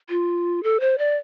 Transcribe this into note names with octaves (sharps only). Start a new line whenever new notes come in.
F4
A4
C5
D5